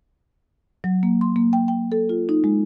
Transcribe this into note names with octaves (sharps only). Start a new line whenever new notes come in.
F#3
A#3
C6
A#3
G5
G5
A4
F4
D#4
G#3